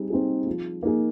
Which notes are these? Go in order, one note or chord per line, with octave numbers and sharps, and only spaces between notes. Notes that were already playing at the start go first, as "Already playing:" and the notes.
Already playing: G3 C4 D#4 G#4
C4 D#4 G#4
F3
A#3 D#4 G#4